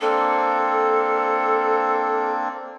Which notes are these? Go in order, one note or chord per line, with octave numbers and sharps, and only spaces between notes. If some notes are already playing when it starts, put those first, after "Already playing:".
A#3 C4 D4 A4